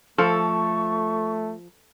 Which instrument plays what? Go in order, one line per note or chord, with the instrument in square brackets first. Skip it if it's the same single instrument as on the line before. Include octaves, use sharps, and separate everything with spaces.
[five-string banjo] F3 [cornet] A3 [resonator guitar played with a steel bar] A4 [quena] C#6